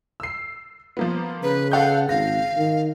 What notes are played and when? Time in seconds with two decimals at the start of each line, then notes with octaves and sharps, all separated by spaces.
0.20 E6 C7
0.97 F3 A#3 B3
1.43 C#3 B4
1.72 A4 F5 F#5 G6
2.09 G#1 F5 A#6
2.57 D#3